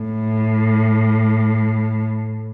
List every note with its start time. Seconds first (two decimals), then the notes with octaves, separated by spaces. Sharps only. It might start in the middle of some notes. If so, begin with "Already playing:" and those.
Already playing: A2